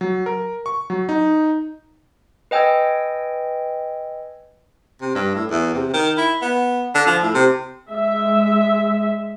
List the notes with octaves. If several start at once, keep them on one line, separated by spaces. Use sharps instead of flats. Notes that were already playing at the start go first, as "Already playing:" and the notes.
F#3
A#4
C#6
F#3
D#4
B4 D#5 G5 G#5 E6 G#6
C3
G2
A2
E2
C3
D#3
E4
B3
D3
F3
A2
C3
G#3 E5